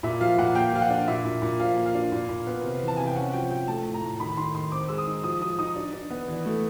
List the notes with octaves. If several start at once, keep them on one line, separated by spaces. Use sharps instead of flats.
A#2 E5
F3 F5
A#2 F#5
A#3 G5
F3 F5
F#5
D4
A#2 E5
A#2
A#2
F3 F5
A#3
F5
D4
A#2
A#2
B3
C3
E3
A5
C3 G#5
G5
C#4 F#5
F3 G5
F3 G5
A3 A5
A2
A#5
A2
D#3 B5
D#3 C6
D#3 C6
C4 D6
G#3 E6
D#6
D#4
F3 D#6
F3 D#6
D#4 D#6
D4
D4
B3
E3
A3